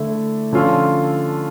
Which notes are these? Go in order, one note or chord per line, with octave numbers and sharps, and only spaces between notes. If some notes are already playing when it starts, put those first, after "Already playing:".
Already playing: D3 A3 E4
D3 F3 C#4 F4 A4